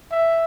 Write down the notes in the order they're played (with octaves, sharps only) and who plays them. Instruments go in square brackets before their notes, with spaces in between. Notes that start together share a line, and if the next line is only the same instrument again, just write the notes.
[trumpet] E5